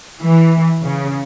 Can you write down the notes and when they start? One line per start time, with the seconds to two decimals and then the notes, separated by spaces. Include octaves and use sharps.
0.23 E3
0.86 C#3